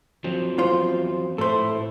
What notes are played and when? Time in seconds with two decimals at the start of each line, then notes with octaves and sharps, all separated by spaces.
0.24 F3 F#3 C4
0.58 E2 F4 C5
1.38 A2 E4 A4 C5